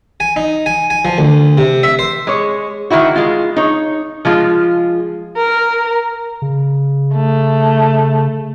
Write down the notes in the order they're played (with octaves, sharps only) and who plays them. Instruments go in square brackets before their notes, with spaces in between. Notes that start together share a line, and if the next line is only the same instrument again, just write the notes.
[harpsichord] G#5
D#4
G#5
G#5
F3
D2
C3
E5
C5
[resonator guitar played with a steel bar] G#3 C#5
D#3 E3 E4 F#4
G#3 F4
D#4 C#5
F3 G#3 F4
[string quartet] A#4
[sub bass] C#3
[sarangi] A3